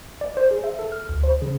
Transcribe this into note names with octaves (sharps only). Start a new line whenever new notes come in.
D5
C5
G#4
E5
A4
F6
D2
C5
C#3